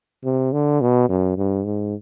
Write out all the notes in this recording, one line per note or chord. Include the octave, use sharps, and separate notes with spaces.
C3
D3
B2
F#2
G2
G#2